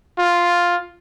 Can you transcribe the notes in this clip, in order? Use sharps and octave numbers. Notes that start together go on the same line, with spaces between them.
F4